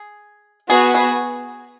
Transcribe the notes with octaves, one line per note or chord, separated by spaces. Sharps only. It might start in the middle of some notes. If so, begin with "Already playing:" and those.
Already playing: G#4
B3 F#4 G#4 B4
G#4